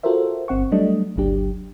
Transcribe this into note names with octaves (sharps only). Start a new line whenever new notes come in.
F4 F#4 A4 A#4 C5 E5
G1 C4 F#5 C#6
F#3 G3 A3 D4 D#5
G1 C#2 F#3 D4 G4